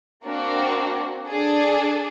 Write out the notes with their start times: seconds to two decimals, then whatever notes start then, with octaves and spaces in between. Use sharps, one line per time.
0.24 A#3 C4 D4 F#4
1.26 D4 G#4 A4